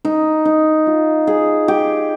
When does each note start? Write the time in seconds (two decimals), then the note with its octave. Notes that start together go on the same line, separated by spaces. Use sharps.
0.05 D#4
0.45 D#4
0.87 F4
1.27 G#4
1.68 G4